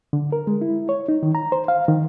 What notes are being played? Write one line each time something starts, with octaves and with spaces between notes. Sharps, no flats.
D3
A#4
G#3
E4
C#5
D#4
D#3
A#5
C5
F5
D#3